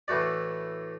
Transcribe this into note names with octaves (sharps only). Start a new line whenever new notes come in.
A2 E3 A3 F#4 D5